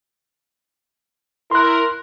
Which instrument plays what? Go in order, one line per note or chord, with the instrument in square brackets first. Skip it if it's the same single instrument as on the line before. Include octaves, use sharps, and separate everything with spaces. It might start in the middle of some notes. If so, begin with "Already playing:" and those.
[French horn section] E4 A#4 [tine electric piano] C6 F#6